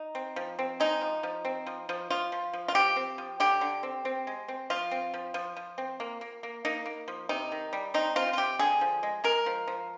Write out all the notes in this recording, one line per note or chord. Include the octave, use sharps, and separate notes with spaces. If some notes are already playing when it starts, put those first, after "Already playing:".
Already playing: D#4
C4
F3
C4
G#3 D#4
F3
F3
C4
F3
F3
F3 F4
F3
F3
F4
F3 G4
C4
F3
D3 G4
D3
C4
C4
G#3
C4
F3 F4
C4
F3
F3
F3
C4
A#3
A#3
A#3
A#3 D#4
A#3
F3
C3 D#4
D#3
G3
C4 D#4
C4 F4
F4
C3 G4
D3 G#4
F3
G#3
G#3 A#4
F3
F3